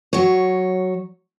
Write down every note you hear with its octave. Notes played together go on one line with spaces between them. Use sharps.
F#3 C#5